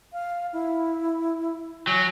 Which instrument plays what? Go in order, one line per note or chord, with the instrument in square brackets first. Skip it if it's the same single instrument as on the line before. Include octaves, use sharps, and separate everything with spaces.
[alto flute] F5
E4
[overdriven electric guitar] F#3 [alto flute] G#5